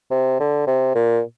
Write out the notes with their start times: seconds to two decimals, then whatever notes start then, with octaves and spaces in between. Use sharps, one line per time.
0.11 C3
0.40 D3
0.67 C3
0.95 A#2